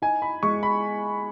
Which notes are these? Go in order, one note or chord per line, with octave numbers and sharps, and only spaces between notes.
D#4 G#5
B5
G#3 C#6
B5